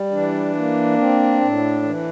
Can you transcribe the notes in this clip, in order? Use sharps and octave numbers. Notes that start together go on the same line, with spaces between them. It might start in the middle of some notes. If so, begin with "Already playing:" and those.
Already playing: G3
E3 D4
A#3
C4
A2
E3